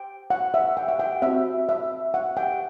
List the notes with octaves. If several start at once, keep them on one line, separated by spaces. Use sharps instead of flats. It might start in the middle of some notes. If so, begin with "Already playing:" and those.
Already playing: G5
F#5
E5
G5
F#5
G5
C4 F#4 E5
E5
F#5
G5